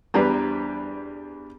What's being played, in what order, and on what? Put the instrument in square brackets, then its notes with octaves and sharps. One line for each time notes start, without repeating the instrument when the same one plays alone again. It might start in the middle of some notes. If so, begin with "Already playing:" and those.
[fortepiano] E2 G3 B4 [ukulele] D4 C5 A#5